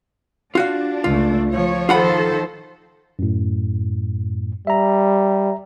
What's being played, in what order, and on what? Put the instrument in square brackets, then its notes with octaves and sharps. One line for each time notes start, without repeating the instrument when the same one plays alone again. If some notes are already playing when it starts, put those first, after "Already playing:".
[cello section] D4 [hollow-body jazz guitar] F4 F#4 F5
[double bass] C#2 A3 [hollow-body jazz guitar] F4
[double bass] F3 [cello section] C#5
[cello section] D#3 A4 C5 [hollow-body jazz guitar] F4 F#5 B5
[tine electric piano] F#2 A2
[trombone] G3 [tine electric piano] E5 A#5